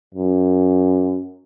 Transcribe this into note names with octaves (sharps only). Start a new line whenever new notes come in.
F#2